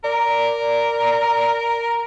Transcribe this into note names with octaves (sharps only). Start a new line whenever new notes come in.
A#4 D5